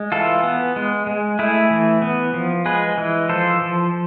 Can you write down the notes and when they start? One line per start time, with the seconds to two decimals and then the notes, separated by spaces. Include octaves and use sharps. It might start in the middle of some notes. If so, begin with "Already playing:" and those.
Already playing: G#3
0.12 E3 F4 A4
0.43 B3
0.76 G#3
1.07 G#3
1.39 A3 E4 G#4
1.71 E3
2.02 B3
2.34 F3
2.66 G#3 G#4 B4
2.98 E3
3.29 F3 A4 C5
3.62 F3